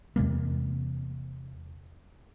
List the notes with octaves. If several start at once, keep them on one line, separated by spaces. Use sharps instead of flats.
E2 C3 G#3 A#3